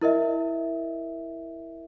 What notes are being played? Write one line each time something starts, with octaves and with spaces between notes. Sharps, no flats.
E4 A#4 D#5 E5